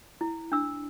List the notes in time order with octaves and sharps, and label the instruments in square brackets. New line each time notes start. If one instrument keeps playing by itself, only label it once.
[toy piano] E4
D4 E6